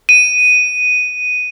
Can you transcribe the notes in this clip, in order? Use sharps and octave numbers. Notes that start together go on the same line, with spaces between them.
D#7